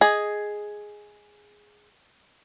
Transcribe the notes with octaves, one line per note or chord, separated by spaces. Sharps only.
G#4 D#5